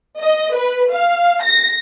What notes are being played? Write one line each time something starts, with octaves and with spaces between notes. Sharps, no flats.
D#5
B4
F5
A#6